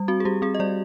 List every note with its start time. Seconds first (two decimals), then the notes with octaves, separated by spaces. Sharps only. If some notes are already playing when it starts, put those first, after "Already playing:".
Already playing: G3
0.08 C4 F#4
0.20 G#4
0.25 G3 G4
0.42 C4 G#4
0.55 D#5
0.60 G3 D5